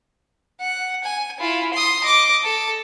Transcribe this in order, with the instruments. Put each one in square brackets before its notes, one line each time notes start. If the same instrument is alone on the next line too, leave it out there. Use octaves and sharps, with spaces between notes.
[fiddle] F#5
G#5
E4 F4
C6 D#6
D#5 D6
A4